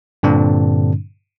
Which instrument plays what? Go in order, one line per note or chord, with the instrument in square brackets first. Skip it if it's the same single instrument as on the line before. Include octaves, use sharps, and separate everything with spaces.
[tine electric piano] G2 A#2 D3 G3 C4 D4